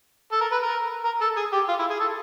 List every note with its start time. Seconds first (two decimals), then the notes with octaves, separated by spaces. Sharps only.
0.32 A4
0.41 A#4
0.52 B4
0.63 A#4
1.05 A#4
1.21 A4
1.37 G#4
1.53 G4
1.69 F4
1.79 E4
1.90 G#4
2.00 A4